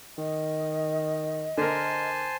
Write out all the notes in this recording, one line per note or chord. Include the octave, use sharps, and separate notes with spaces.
D#3 D#5
D3 A#4 C5 G#5 A5